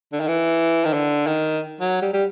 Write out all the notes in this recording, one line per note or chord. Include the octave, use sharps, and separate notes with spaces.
D3
D#3
E3
D#3
D3
D#3
F#3
G3
G3